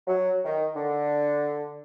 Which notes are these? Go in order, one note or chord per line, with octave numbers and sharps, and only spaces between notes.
F#3
D#3
D3